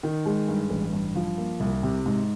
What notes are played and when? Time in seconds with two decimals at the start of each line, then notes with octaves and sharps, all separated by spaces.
0.03 D#3
0.26 G#3
0.48 G2
0.70 A1
0.93 G2
1.15 F3
1.38 A#3
1.60 C2
1.83 C3
2.06 G#2